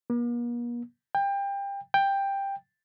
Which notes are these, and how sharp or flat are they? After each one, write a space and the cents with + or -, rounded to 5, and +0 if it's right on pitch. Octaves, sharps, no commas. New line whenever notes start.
A#3 +45
G5 +25
G5 +10